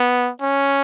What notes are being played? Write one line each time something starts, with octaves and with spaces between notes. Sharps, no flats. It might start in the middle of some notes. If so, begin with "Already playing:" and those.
Already playing: B3
C#4